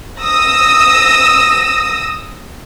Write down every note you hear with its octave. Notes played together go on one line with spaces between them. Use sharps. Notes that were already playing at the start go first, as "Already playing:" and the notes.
D#6 E6 A#6